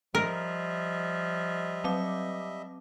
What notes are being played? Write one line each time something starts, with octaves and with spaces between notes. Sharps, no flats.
F3 G3 A#4 D#5 E5
F#3 C4 D6